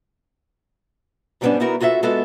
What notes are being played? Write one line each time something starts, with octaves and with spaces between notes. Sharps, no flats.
G#2 G3 A3 B3 C#4 D4
B3 D#4 E4 F#4 A#4
F4 F#4 A4 C#5 E5
G#3 B3 F4 F#4 A4